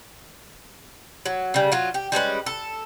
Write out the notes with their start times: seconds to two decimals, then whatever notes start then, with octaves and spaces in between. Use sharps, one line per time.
1.26 F#3
1.54 C#3 G3
1.72 F#3 F4
1.94 G4
2.12 G3 G#3 C#4 B4
2.46 A4